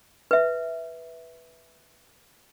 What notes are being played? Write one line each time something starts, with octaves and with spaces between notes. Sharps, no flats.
B4 E5